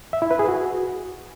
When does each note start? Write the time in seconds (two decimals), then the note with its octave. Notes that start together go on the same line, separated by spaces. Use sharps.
0.13 E5
0.22 E4
0.31 B4
0.39 G#4
0.48 F#4